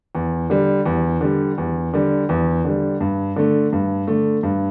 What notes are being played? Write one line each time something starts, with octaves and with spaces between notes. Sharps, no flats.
E2
D3 G3
E2
D3 G3
E2
D3 G3
E2
D3 G3
G2
D3 A3
G2
D3 A3
G2